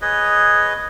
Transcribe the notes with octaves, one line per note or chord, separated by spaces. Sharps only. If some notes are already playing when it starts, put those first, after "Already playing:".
G#4 B4 C#5 D#5